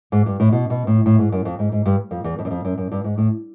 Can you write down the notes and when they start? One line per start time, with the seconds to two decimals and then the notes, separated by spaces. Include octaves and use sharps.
0.12 G#2
0.26 G2
0.40 A2
0.52 B2
0.70 B2
0.87 A2
1.06 A2
1.19 G#2
1.32 F#2
1.45 F2
1.59 G#2
1.72 G#2
1.86 G2
2.11 F2
2.24 E2
2.39 F2
2.45 F#2
2.51 F2
2.65 F#2
2.78 F#2
2.92 G2
3.04 G#2
3.18 A2